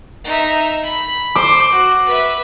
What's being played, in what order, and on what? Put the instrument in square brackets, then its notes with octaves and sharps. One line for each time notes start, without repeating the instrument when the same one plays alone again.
[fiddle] D#4 E5
B5
[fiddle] C5 [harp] D6
[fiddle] F#4
B4 E5